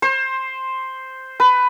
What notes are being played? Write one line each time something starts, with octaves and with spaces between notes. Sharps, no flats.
C5
B4